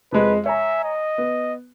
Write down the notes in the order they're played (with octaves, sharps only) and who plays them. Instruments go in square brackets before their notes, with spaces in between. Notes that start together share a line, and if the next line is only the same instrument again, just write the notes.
[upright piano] F2 G#3 [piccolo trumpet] B4
[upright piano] C#5 G#5 A#5 [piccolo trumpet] E5
[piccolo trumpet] D#5
[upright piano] B3